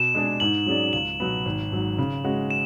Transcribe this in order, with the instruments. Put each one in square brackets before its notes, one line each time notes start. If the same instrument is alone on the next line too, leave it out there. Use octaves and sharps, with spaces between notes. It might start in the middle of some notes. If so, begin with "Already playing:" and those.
Already playing: [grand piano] B2 [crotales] E7
[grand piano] G#3 D4 G#4 D5
[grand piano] G#2 [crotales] F#7
[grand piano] F#3 C#4 G#4 D5
[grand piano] C#2 [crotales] F#7
[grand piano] B2 F#3 B3
G#1
G#2 F#3
C#3
G#3 C#4 F#4
[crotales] E7